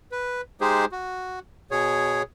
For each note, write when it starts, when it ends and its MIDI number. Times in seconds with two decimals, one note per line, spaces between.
0.12 0.41 71
0.61 0.85 56
0.61 0.85 63
0.61 0.85 67
0.61 0.85 68
0.61 0.85 72
0.92 1.39 66
1.71 2.22 47
1.71 2.22 68
1.71 2.22 73